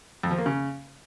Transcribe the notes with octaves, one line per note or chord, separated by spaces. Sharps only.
F2
F3
A#3
C#3